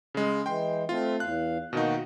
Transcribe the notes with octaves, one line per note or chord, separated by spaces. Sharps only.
C#3 G#3
E3 G#3 G5 C6
A3 C4 F4
E2 F5 F#6
B2 D#3 A#3 D#4 F#4